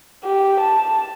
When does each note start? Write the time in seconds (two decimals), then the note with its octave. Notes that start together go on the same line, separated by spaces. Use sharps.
0.24 G4
0.60 A5